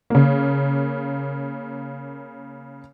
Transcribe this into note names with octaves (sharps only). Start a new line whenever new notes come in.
C#3 A#3